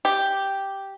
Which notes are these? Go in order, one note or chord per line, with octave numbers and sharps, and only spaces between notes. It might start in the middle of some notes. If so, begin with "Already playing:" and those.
G4